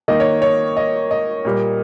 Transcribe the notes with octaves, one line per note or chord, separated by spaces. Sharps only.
D#3 A#3 D#5
C#5
C#5
D#5
D#5
A#2 G3 A#3